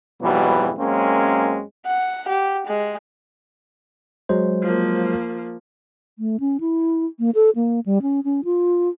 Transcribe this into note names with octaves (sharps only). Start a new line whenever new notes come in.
F2 G#2 B2 E3 F#3 G3
F#2 G#3 A#3 C4 C#4
F#5
G4
G#3
F#3 G#3 C5
F3 A#3
A3
C#4
E4
A#3
A4
A#3
G3
C#4
C#4
F4